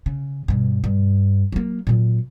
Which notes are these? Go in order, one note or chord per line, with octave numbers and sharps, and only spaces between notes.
C#3
G2 B2
G2
F#3 A#3
A#2 F#3